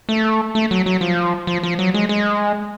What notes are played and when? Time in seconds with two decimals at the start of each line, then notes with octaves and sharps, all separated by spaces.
0.09 A3
0.55 A3
0.71 F#3
0.86 F#3
1.01 F3
1.47 F3
1.63 F3
1.79 F#3
1.94 G#3
2.09 G#3